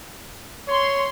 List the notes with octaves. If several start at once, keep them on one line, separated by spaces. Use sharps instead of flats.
C#5 C6